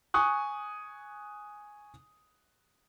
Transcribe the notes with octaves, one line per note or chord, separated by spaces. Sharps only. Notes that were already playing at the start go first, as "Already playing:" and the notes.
G#5 C#6 D#6 F#6